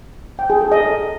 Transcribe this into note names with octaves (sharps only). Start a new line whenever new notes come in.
G5
G#4
A4
D#5